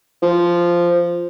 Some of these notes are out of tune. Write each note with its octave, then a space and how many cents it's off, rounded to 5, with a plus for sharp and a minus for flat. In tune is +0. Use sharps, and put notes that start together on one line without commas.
F3 -10